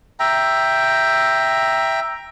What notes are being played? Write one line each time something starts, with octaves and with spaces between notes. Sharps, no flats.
E5 G5 A#5